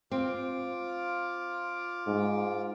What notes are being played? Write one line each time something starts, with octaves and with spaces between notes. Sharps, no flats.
C4 F4 D6
G#2